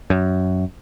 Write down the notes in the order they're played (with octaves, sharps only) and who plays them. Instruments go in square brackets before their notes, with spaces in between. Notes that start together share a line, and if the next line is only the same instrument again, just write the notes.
[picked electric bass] F#2